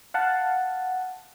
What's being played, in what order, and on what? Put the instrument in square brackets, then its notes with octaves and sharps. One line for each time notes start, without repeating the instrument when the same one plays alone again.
[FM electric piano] F5 F#5 A5